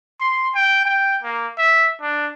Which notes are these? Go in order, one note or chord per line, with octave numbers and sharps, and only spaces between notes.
C6
G5
G5
A#3
E5
D4